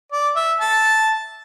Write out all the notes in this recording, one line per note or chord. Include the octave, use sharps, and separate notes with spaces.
D5
E5
A5